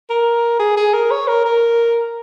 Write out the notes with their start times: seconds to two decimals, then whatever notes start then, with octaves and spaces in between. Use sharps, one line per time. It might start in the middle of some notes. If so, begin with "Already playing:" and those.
0.10 A#4
0.59 G#4
0.77 G#4
0.93 A#4
1.11 C#5
1.28 A#4
1.45 A#4